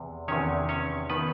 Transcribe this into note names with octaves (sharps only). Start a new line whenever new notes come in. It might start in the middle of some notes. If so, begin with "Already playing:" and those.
Already playing: E2 C3
E2 C3 D#3 C#4 C#5
C#4 C#5
D#3 B3 B4